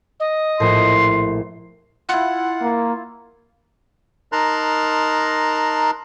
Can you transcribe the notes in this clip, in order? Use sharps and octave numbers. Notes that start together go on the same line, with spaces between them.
D#5
A#1 A2 C6
E4 F4 F#5
A#3
D#4 A#4 A5 A#5 C6 F#6